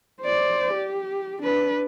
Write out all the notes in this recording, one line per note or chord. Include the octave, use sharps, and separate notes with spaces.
C5 D5
G4
D4 B4